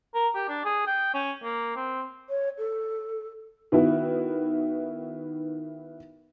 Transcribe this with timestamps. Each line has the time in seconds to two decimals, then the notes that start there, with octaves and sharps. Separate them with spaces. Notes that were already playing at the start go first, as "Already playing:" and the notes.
0.14 A#4
0.35 G4
0.49 D4
0.65 G#4
0.87 G5
1.14 C#4
1.43 A#3
1.76 C4
2.29 C#5
2.58 A4
3.72 D#3 B3 E4 F#4